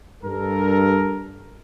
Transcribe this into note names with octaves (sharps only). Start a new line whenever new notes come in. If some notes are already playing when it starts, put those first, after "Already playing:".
G2 A4 A#4